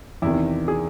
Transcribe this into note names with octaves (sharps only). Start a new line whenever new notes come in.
E2 C3 D#3 E4
G#4